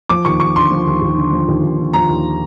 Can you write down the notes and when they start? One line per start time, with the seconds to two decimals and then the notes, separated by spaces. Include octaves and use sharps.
0.09 F3 D6
0.25 D#2 C#6
0.40 D#2 C#6
0.55 D3 C6
0.71 F3
0.87 D#2
1.02 D#2
1.17 D3
1.32 F3
1.48 D#2
1.63 D#2
1.78 D3
1.93 F3 A#5
2.09 D#2